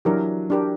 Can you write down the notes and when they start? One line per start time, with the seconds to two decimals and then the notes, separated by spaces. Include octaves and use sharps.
0.05 E3 F#3 D4 G4 A#4
0.50 D4 G4 A#4